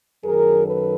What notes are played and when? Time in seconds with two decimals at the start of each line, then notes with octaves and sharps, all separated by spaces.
0.24 F#2 D#3 F#3 G#4 A#4
0.67 A4 B4